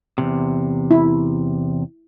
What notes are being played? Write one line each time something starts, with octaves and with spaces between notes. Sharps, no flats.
E2 G#2 C3
E4